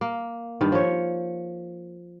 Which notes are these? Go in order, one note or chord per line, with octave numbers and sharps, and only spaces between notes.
A#3
G2 D#3
F3 C#5